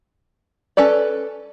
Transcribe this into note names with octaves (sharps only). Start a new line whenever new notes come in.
C#4 A4 B4 D5